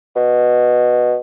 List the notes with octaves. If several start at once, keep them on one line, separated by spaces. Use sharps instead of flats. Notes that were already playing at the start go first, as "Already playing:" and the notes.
B2